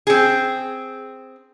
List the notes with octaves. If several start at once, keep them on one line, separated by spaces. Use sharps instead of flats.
C4 G#4